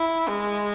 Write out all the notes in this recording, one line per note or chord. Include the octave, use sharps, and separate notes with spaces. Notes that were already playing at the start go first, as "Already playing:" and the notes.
Already playing: E4
G#3